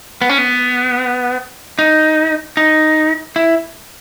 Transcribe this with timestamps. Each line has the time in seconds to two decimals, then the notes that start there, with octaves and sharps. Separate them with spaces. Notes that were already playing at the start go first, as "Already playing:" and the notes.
0.22 B3
0.29 C#4
0.38 B3
1.79 D#4
2.57 D#4
3.36 E4